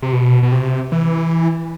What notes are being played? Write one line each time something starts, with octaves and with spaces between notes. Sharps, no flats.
C3
B2
B2
C3
E3